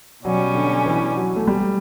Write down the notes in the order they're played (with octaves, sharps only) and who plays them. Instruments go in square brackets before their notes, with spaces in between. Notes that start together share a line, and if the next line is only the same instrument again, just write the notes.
[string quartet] B2 G3 C#4 [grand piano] F#3
[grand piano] D3
E3
F#3
A3
G3